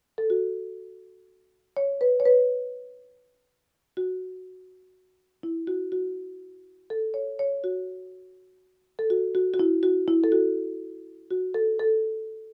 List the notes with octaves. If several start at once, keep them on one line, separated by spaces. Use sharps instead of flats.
A4
F#4
C#5
B4
C#5
B4
F#4
E4
F#4
F#4
A4
C#5
C#5
F#4
A4
F#4
F#4
F#4
E4
F#4
E4
A4
F#4
F#4
A4
A4